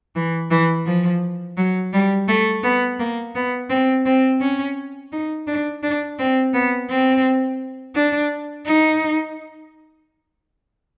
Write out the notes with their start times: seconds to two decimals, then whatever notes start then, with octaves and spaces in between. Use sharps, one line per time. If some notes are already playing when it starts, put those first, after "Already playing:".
0.16 E3
0.51 E3
0.86 F3
1.57 F#3
1.93 G3
2.28 A3
2.63 B3
3.00 A#3
3.35 B3
3.70 C4
4.06 C4
4.41 C#4
5.12 D#4
5.47 D4
5.83 D4
6.19 C4
6.54 B3
6.89 C4
7.96 D4
8.66 D#4